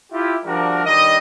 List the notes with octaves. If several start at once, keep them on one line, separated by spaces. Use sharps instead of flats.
E4 F4 G4
F3 G3 D4 F#4 A#4
G2 D#3 G3 D#5